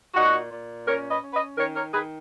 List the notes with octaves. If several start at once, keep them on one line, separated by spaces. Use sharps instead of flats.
A#2 D#4 F#4
A#2
C#4 A#4 C#5
B4 D#5
C#4
B4 D#5
D#3 A#4 C#5
A#4 C#5
D#3 G#4 B4